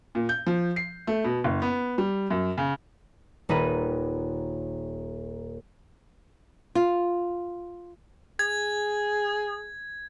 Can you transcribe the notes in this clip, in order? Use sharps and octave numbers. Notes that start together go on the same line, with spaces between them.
A#2
G6
F3
C7
A3
B2
F#1
B3
G3
F#2
C#3
D#1 D#4 B4 D#7
F4
G#4 G#6